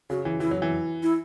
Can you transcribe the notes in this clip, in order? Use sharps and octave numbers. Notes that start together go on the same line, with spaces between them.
C#3 F#4
E3
E3 E4
F#3
E3
E4